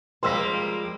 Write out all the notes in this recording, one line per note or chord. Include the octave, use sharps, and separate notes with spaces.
F3 G3 G#3 A#3 C4 C6 E6 B6